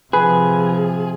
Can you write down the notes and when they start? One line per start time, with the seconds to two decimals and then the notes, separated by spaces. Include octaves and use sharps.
0.13 C3 F3 G#4 B4